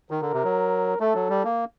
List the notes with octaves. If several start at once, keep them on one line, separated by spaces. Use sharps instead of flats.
D#3 A#4
D3
C3
F#3
A3 A4
F#3
G3
A#3